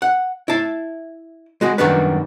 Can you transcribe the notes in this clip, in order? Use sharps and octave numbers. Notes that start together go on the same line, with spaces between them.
F#5
E4 A5
G#3 F#4 G#4
F#2 D#3 G3 B3 D4 B4